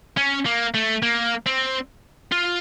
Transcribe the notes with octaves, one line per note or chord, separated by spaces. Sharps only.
C#4
A#3
A3
A#3
C4
F4